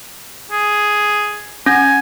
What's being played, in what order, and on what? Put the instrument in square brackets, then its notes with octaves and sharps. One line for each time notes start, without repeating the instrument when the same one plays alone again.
[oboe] G#4
[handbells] C#4 [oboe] G#5